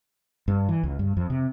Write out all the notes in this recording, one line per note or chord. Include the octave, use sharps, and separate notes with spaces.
G2
E3
C#2
G2
F2
C3